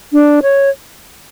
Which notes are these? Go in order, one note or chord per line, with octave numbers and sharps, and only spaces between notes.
D4
C#5